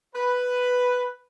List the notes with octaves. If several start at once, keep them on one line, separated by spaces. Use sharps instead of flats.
B4